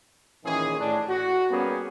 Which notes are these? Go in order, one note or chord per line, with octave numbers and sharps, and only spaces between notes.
A#2 D#3 E3 C#4 G#4
A2 D4
F#4
G3 A#3 B3 C#4 G4 G#4